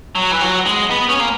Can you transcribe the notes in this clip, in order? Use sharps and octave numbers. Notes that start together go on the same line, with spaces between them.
F#3
E3
F#3
G#3
B3
C#4
A#3